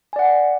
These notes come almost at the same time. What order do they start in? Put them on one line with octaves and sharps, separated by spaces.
G#5 D5 F#5